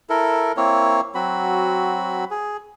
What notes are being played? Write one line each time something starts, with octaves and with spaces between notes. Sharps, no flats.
E4 A4 A#4
A#3 C4 E4 C#5
F#3 C4 F#4 B5
G#4